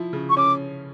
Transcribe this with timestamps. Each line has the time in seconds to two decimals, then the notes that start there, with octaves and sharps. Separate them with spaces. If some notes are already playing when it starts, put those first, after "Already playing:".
Already playing: F3 E4
0.13 C#3
0.30 C#6
0.37 C#4 D6